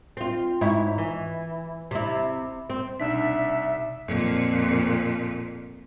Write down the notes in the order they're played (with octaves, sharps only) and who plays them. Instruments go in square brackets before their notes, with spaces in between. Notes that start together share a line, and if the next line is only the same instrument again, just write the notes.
[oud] C4 F4
G#2 E4 C#5
E3
C3 E4
C4
[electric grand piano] C2 D4 B6 [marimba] B2 D#4 [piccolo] E5
[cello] F2 A#2